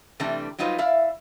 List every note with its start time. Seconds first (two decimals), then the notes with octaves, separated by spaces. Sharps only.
0.20 C3 E3 G3 A3 D4 G4
0.58 F#3 G3 D#4 F4 B4 C5
0.78 E4 D5 E5 F5